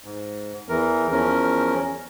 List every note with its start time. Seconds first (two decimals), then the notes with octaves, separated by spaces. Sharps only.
0.04 G#2
0.69 E2 E3 A#4
1.12 E2 F3 C#4 A#4